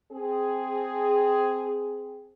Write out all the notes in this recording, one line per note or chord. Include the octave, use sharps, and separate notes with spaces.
C4 G#4